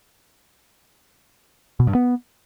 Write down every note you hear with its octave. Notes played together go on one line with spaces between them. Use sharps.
B2
G2
B3